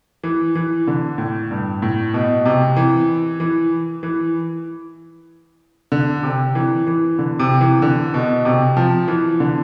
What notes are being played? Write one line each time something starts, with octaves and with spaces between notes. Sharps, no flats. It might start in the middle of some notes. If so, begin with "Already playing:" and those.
E3
E3
D3
A2
G2
A2
B2
C3
E3
E3
E3
D3
C3
E3
E3
D3
C3
E3
D3
B2
C3
F3
E3
D3